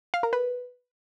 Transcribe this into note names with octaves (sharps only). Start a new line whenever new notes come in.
F5
A#4
B4